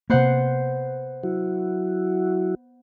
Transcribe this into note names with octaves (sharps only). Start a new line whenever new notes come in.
C3 A#3 B3 C5 F#5
F#3 E4 F#4